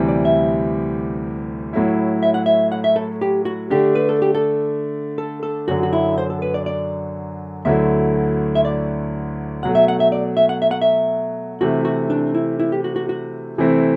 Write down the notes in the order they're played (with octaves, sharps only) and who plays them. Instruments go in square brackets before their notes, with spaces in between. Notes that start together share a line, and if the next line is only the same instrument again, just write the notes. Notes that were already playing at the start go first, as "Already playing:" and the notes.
Already playing: [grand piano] D2 C3 E3 G3
[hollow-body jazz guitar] D5
E5
[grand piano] A2 F#3 A3 E4
[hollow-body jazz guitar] E5
F#5
E5
F#5
E5
A4
G4
F#4
[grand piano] D3 A3 D4 [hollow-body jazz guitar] G4
[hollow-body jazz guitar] B4
A4
G4
A4
A4
A4
[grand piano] F#2 D3 F#3 [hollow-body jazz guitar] F#4
[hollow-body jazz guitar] F#4
E4
C5
A4
B4
D5
D5
[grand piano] D2 D3 F#3 A3 E4 [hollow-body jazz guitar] E5
[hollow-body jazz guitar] E5
D5
[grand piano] B2 F#3 A3 [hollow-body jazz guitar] F#5
[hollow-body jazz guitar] E5
F#5
E5
D5
E5
F#5
E5
F#5
E5
[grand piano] C3 E3 A3 [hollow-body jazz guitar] F#4
[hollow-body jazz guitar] F#4
D4
E4
E4
G4
F#4
F#4
F#4
[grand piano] C3 E3 A3 C4 E4